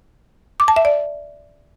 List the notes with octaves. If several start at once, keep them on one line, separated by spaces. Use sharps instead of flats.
D6
A5
E5
D5